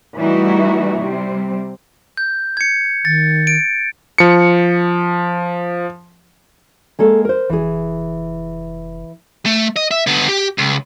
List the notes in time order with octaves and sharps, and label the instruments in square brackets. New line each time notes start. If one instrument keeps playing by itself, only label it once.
[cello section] E3 G3 A3 D#4 E4 F#4
C3 G3 C4
[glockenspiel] G6
G#6 C#7
[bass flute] D#3 [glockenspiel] A6
[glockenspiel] D7
[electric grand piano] F3 C#7
[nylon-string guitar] G#3 A#3 A4
A#4 C5
[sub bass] F1 [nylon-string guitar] E3 G#4
[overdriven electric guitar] A3
D#5
E5
D3 B3
G4
C#2